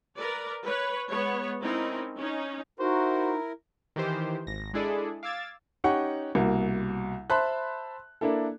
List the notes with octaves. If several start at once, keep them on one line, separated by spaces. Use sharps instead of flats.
A#4 B4 D5
B4 C#5
G#3 B3 C#5
C4 C#4 D#4 E4 A#4
C#4 D#4
D#4 E4 F#4 A#4 C5
D#3 E3 G4 C5
G#1 A#6
G#3 D4 E4 G#4 A4 D5
F5 D6 E6 G#6 A6
C#4 D#4 G4 F#5 C#6
C2 B2 A#3
C5 E5 A5 B5 C6 F#6
A#3 D4 E4 A4